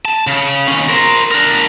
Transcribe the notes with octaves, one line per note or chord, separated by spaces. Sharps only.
A5
C#3
D#2 C#4
A#4 C5
D4 A#4